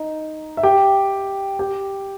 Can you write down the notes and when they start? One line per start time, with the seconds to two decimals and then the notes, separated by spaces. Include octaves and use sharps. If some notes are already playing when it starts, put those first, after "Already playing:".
Already playing: D#4
0.57 E5
0.63 G4 G5
1.59 G4 G5